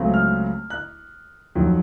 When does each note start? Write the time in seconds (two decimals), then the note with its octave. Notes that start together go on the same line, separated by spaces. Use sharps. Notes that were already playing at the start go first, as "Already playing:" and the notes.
Already playing: C#2 C#3 F#3 A3 C4
0.14 F6
0.70 F#6
1.55 F2 D#3 F#3